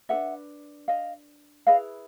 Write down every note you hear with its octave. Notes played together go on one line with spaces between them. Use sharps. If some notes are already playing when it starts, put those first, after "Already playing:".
D4 G4 B4 E5 F#5
D#5 F5
E4 G#4 B4 D#5 F5